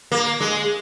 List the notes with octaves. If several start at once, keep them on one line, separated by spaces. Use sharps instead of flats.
A#3
G#3